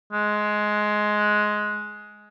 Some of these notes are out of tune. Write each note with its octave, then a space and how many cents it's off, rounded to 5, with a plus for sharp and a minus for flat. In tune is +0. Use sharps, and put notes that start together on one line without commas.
G#3 +15